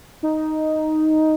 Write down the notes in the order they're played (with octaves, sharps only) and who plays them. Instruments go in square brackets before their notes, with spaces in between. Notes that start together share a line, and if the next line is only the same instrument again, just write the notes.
[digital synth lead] D#4